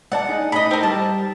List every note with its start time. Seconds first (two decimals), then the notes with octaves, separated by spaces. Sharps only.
0.12 G#2 D5 F#5 A5
0.29 D#4 G#4
0.52 A2 D#4 D#5 B5
0.71 C4 A#4
0.83 G3 A5